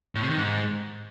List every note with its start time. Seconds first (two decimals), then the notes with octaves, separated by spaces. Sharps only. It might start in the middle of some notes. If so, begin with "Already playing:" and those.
0.15 A2
0.22 C3
0.30 D#3
0.37 G#2